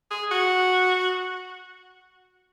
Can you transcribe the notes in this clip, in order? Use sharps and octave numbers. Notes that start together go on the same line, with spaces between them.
G#4
F#4